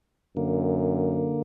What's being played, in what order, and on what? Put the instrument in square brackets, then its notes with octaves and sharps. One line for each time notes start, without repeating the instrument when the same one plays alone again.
[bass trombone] F#2 [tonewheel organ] D3 A#3